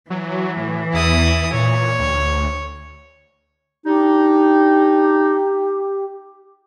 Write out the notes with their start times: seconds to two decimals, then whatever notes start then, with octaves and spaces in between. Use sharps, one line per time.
0.10 E3 F#3
0.57 A2
0.94 E2 E4 D#6
1.53 A#2 C#5
1.99 D2
3.85 D4 D#4 G4